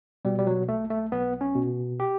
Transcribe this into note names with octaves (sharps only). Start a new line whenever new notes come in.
B2 G3
G3
F#3
B1 A3
A3
B1 B3
C#4
B2
G4